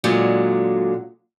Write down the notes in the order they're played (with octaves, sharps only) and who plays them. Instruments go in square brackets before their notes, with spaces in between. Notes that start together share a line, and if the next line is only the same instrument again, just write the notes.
[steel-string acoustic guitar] A#2 D3 F#3 G#3